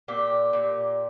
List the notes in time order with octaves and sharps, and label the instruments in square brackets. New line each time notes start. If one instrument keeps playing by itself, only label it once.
[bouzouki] A#2 G4
A#2